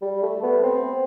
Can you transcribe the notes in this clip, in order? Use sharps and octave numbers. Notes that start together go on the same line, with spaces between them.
G3
A3
B3
C4